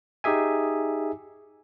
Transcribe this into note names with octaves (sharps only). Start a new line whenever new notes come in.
D#4 G4 G#4 E5 G#5